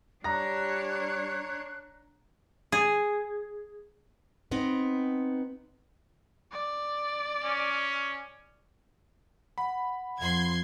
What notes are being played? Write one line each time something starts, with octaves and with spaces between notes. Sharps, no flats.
G3 D4 C#5 A#5 F#6 A#6
G#4
B3 C4 D#4
D5
C#4
F#5 B5
F2 C6 G#6